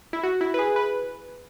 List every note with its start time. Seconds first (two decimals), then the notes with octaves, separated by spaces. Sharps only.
0.13 E4
0.23 F#4
0.41 E4
0.54 B4
0.59 G#4
0.76 B4